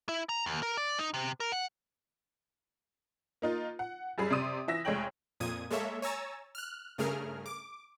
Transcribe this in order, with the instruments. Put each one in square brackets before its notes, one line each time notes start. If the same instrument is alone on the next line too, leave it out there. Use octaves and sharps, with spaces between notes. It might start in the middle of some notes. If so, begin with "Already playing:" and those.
[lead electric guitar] E4
A#5
D#2
A#4
D5
D#4
C3
A#4
F#5
[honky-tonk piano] A#3 D#4 F4
F#5
F#2 G3 G#4 B5
C3 D5 C6 D#6 D#7
E3 E5 A#6
F1 G#3 A3 C#5 G5 F#7
[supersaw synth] F2 A#2 D#6 G#6 D#7
G#3 A#3 A4 C#5 E5
C#5 G#5 A#5 E6 A6
F6 F#6
G2 C#3 A3 G#4 A#4 F6
D6